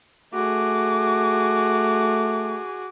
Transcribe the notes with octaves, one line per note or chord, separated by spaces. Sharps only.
A3 F#4 G#4 D6